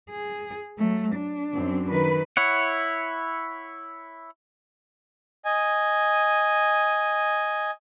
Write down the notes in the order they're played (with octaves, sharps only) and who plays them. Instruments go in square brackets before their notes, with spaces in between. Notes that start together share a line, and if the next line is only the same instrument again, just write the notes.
[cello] G#4
F#3 A3
D4
[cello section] F#2 C4
[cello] D#3 [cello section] B4
[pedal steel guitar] E4 C#5 F#5
[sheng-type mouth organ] D#5 G#5